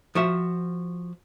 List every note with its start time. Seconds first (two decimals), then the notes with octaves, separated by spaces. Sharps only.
0.15 F3 F#4 E5